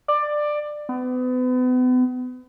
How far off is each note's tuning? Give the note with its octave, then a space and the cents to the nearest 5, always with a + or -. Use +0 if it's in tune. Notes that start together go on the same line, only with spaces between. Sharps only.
D5 +15
B3 +35